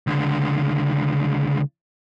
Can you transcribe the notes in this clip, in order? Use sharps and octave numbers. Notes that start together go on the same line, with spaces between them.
C#2 D3